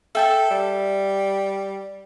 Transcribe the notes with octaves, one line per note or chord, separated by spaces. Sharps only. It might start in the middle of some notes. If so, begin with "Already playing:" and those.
A4 E5 G5 A5
G3